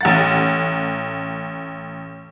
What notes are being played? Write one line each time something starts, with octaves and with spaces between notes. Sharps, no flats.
A1 F#5 A6